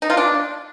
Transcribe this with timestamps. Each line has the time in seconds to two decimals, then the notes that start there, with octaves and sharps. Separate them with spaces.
0.02 D#4
0.10 F4
0.17 D4